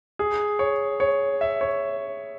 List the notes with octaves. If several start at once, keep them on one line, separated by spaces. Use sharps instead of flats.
G#4
C#5
C#5
E5
C#5